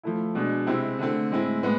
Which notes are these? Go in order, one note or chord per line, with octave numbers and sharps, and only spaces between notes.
F3 A3 E4
B2 G#3 D4
C3 G#3 C4 E4
D3 A3 C4
A2 G#3 C4 E4
A2 G#3 B3